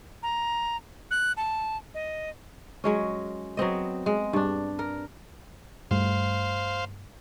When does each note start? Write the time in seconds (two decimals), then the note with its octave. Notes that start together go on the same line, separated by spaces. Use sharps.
0.23 A#5
1.11 F#6
1.37 A5
1.94 D#5
2.84 F#3 G#3 C#4
3.57 F#3 B3 C4 D#5
4.06 G#3
4.33 G2 D4
4.79 A#4
5.91 G2 G3 A3 C5 F5